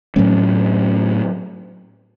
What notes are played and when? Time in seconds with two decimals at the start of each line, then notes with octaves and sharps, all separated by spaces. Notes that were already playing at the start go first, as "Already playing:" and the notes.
0.16 A2 F#3 A3 C#4